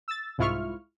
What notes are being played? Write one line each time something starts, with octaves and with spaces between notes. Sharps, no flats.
E6 A6
C2 G#2 E4 F4 C#6 F6